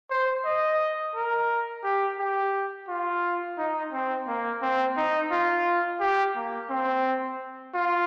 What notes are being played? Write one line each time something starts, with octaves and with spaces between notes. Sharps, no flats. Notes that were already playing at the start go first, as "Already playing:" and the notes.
C5
D#5
A#4
G4
G4
F4
D#4
C4
A#3
C4
D#4
F4
G4
A#3
C4
F4